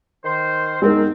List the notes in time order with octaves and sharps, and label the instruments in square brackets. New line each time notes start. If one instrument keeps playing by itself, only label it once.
[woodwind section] D#3 C5
[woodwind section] F#2 B3 C4 [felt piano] G#3 D#4 A#4